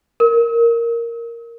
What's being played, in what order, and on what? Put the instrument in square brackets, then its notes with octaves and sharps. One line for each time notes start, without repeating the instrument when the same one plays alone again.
[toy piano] A#4